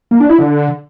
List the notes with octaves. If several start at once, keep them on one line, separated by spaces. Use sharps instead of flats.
A#3
D4
E4
D3